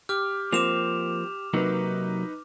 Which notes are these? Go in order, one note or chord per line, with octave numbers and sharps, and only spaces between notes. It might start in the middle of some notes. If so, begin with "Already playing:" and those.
G4 D6 F6
F3 A#3 C4 D6 E7 F7
C3 F#3 A#3 D#4 B4